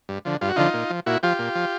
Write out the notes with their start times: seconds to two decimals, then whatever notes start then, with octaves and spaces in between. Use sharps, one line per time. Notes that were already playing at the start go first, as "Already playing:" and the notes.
0.09 G2
0.25 D3 F3
0.41 G2 F4
0.49 F#4
0.56 D3 F3 D#4 F4
0.74 A#2
0.90 F3
1.06 A#2 E4 F#4
1.23 F3 F4 G4
1.39 A#2
1.55 F3